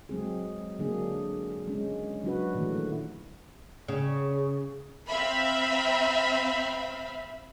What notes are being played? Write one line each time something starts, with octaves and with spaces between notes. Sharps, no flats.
F#3 G#3 C4 G#4
D3 F#3 A#3 D4 G#4
G#3 C#4
F#3 D4 F#4 B4
A#2 D#3 E3 A3
C#3
C4 E5 F5 B5